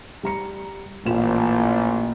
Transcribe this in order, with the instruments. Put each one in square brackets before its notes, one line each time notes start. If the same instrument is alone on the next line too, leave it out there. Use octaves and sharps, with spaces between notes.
[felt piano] G3 A#5 C#7
[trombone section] A1 [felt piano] A#2 F4 E7